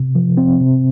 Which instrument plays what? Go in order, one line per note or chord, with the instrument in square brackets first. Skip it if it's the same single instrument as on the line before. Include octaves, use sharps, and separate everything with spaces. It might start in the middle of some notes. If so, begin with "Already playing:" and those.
Already playing: [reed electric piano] C3
F3
C4
C3